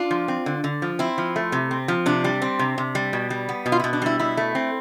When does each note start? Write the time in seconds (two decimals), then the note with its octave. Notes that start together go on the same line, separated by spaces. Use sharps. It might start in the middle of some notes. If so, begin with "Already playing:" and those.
Already playing: D4 F4
0.11 F3
0.28 C4
0.46 D3
0.64 D3
0.82 F3
0.99 C4 E4
1.18 F3
1.36 A3
1.52 C3
1.71 C4
1.88 F3
2.06 C3 D4
2.24 G3
2.42 C4
2.59 C3
2.78 C3
2.95 G3
3.13 B2
3.30 G3
3.49 B3
3.66 B2
3.72 F4
3.80 B2 E4
3.93 D4
4.02 G3 E4
4.19 B2 E4
4.37 A3
4.55 C4